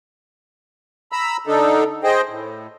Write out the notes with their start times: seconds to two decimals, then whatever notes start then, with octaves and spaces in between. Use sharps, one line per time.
1.12 A#5 B5 E6
1.47 D3 D4 D#4 A4
2.04 G#4 C5 D#5 G5
2.28 A2